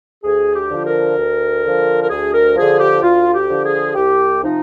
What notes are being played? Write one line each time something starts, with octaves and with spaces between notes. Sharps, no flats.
D2 G#4
G4
D3 F3
A#4
D2
D3 F3
A#4
D2 G#4
A#4
D3 F3 G#4
G4
D2 F4
G4
D3 F3
G#4
C2 G4
C3 F3 D#4